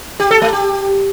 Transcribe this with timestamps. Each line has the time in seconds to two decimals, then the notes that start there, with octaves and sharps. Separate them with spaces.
0.20 G4
0.31 A4
0.42 A3
0.53 G4